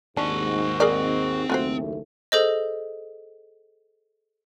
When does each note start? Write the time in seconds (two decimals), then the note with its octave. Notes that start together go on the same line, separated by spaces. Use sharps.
0.17 D#2 G#2 C4 D4 F#4 G#5
0.80 G#4 A#4 D5
1.50 F#1 D#2 A3 F4 F#4 C5
2.32 G#4 A4 C5 D#5